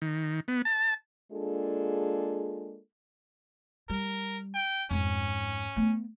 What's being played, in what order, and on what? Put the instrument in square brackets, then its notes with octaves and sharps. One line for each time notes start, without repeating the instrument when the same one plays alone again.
[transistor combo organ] D#3
B3
A5
[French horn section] G#3 A#3 D4 F4 G#4 A4
[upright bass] G3 [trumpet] A#4
[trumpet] G5
[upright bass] F2 G#2 [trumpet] C#4
[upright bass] A3 B3